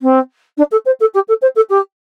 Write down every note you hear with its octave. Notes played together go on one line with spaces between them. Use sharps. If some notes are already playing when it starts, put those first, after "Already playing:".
C4
D4
A4
C5
A4
G4
A4
C5
A4
G4